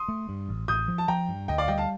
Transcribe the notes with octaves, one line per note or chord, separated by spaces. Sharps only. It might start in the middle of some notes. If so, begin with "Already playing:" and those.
Already playing: C6 D#6
A3
G2
A1
A1 D#6 G6
F3
A5
F3 G5 A#5
G2
D2 D#5 G5
D5 F5
G3 D#5 G5
F5 A5